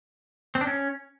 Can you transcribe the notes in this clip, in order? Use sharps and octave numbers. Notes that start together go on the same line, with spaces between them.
C4
D4
C#4